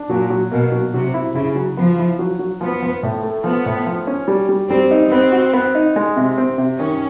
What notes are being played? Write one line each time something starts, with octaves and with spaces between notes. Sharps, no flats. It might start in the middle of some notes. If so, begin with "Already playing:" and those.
Already playing: D4
A#2 F#3
F#3
B2 A#3
F#3
C3 F#3
E4
C#3 E4
F#3
F3 B3
E4
F#3
F#3
F3 B3
F3
A2
A3
F3 B3
A2
F3
C#4
G3
G3
G3 C4
D#4
B3 C4
F#4
B3
D#4
G#3
C3
C4
C3
D#3 C#4